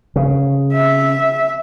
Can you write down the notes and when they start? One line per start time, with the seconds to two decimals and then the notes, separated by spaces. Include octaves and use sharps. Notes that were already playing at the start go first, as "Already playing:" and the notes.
0.16 C#3
0.73 E5